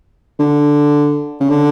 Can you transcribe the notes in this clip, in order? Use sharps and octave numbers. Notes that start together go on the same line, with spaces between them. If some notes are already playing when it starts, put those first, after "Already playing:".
D3
C#3
D3